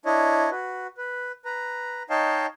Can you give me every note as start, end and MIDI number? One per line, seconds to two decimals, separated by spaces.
0.05 0.50 62
0.05 0.50 64
0.05 0.50 73
0.05 0.50 75
0.51 0.87 66
0.51 0.87 71
0.98 1.32 71
1.45 2.03 71
1.45 2.03 82
2.10 2.46 63
2.10 2.46 73
2.10 2.46 75
2.10 2.46 77
2.10 2.46 79
2.10 2.46 81